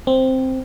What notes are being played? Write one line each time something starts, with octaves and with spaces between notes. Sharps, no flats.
C4